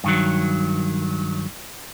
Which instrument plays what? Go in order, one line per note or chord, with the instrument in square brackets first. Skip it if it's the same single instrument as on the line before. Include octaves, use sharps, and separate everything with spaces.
[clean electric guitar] G2 D#3 F#3